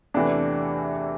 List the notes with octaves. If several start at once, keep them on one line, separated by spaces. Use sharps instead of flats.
E2 C3 E3 A3 D4